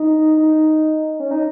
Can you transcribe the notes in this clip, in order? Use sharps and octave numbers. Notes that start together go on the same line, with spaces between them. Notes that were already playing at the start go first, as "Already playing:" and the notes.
Already playing: D#4
D#4
C#4
D#4